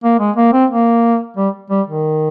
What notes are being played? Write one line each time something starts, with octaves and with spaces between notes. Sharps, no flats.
A#3
G#3
A#3
C4
A#3
G3
G3
D#3